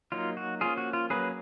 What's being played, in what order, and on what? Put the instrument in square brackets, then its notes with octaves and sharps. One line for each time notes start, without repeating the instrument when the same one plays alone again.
[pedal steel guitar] F#3 A#3 D#4 F4
F#4
F3 A#3 C#4 F4 G#4
F#4
F4
F#3 A#3 C#4 G#4 B4